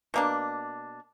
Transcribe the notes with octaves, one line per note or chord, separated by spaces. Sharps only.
B2 A#3 D4